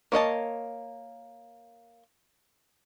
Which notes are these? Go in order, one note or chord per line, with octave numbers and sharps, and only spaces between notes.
A#3 C#5 D#5 A5